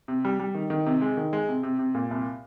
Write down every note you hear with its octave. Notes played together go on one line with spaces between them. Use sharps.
C3
G3
G3
D#3
D#3
C3
G#3
D#3
G#3
C3
C3
C3
A#2
C2